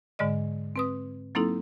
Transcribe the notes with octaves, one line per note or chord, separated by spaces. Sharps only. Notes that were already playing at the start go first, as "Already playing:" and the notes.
G#2 D3 G#3 D5 D#5
C4 B4 D#6
F#3 A#3 C4 D#4 E4 A4